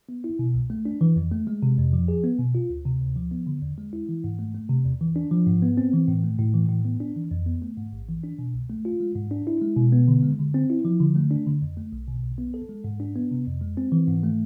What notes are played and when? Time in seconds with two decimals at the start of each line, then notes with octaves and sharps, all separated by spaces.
0.09 B3
0.24 E4
0.39 B2
0.54 C2
0.70 A3
0.85 D4
1.01 E3
1.16 F2
1.31 A3
1.47 G#3
1.63 C3
1.78 F2
1.93 F3
2.08 G#4
2.24 B3
2.39 B2
2.55 F4
2.70 D2
2.85 C3
3.01 D2
3.16 F3
3.31 B3
3.47 D3
3.62 E2
3.78 G#3
3.93 E4
4.09 E3
4.24 G#2
4.39 A3
4.55 A3
4.70 C3
4.85 E2
5.01 E3
5.16 D4
5.32 F3
5.47 G#2
5.63 B3
5.77 C4
5.93 E3
6.08 A2
6.24 A3
6.39 A2
6.54 E3
6.69 A2
6.85 B3
7.00 D4
7.16 E3
7.31 F2
7.46 B3
7.62 A3
7.78 G#2
7.93 A1
8.08 E3
8.24 D4
8.39 B2
8.54 C2
8.70 A3
8.85 F4
9.00 G#3
9.16 G#2
9.31 D4
9.47 E4
9.62 G#3
9.77 B2
9.92 B3
10.08 D3
10.23 G#3
10.39 D3
10.54 C4
10.70 E4
10.85 F3
11.00 D3
11.16 A3
11.31 D4
11.46 D3
11.62 F2
11.77 A3
11.92 B1
12.08 B2
12.23 B1
12.38 B3
12.54 A4
12.69 G#3
12.84 G#2
13.00 D4
13.16 B3
13.31 C3
13.47 F2
13.61 G#3
13.77 C4
13.92 E3
14.08 G#2
14.23 A3